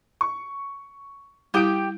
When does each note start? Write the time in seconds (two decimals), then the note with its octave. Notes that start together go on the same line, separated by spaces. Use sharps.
0.21 C#6
1.54 G3 E4 G4 G5 D#6 G6 D7